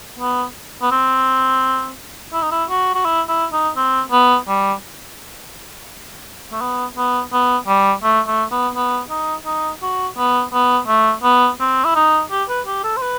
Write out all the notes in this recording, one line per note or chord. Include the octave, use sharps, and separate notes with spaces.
B3
B3
C4
E4
D#4
E4
F#4
F#4
E4
E4
D#4
C4
B3
G3
A3
B3
B3
B3
G3
A3
A3
B3
B3
D#4
D#4
F#4
B3
B3
A3
B3
C4
E4
D#4
G4
B4
G4
A4
C5
B4